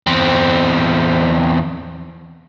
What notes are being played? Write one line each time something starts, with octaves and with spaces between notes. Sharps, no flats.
E2 C4